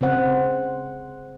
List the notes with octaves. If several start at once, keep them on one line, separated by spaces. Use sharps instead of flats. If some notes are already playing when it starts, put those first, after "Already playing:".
C#3 C4 C5 F#5